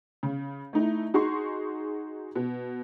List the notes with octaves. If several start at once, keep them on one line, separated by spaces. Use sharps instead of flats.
C#3
A3 D#4 E4
D#4 F#4 G#4 C6 C#6
B2